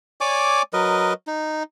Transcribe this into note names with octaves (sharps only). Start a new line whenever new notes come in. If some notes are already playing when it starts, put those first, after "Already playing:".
C#5 D5 G#5 D6
F#3 A#4 B4 D#5
D#4